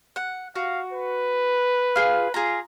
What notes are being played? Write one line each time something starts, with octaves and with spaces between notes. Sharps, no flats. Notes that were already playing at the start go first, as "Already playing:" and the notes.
F#5
F#4 F5
B4
F4 G#4
F4 G#4 A#5